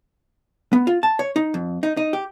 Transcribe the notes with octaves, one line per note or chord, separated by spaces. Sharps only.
B3
F4
A5
C#5
D#4
F2
D#4
D#4
G4